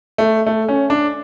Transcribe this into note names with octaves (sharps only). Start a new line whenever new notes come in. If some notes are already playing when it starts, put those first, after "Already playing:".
A3
A3
C#4
D4